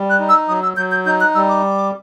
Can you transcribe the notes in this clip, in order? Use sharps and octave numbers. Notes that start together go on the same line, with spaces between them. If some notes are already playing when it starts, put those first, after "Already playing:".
Already playing: G3
F#6
D#4
E6
F#3 D#6
E6
F#3 G6
G6
D#4 G6
F#6
G3 E6
D6